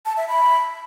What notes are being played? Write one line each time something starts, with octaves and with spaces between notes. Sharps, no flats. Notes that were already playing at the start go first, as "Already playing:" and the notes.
A5
E5
B5